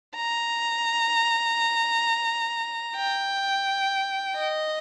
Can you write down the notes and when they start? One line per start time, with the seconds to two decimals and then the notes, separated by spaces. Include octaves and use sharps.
0.16 A#5
2.96 G5
4.36 D#5